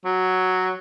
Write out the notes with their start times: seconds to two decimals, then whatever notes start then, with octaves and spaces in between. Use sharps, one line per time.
0.05 F#3